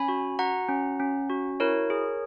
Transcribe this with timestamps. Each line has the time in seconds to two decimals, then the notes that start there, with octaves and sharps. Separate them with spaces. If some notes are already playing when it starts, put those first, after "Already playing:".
Already playing: C#4 G#5 B5
0.08 F#4
0.39 F#4 F#5 A#5
0.69 C#4
1.00 C#4
1.30 F#4
1.60 E4 A#4 C#5
1.90 G#4